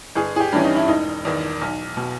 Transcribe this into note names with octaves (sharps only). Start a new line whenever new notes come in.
G1 G#4
G#4
G4
G2 E3 C#4
D#4
E4
E1 D#4
E2 D#3
B1
B2